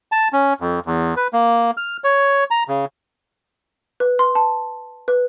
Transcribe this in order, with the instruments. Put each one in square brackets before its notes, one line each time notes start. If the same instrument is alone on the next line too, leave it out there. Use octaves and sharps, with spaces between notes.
[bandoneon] A5
C#4
F2
E2
B4
A#3
F6
C#5
A#5
C#3
[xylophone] B4
C6
A5
B4